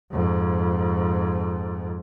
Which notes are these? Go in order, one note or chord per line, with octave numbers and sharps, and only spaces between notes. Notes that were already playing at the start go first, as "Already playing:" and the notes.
F2 G#2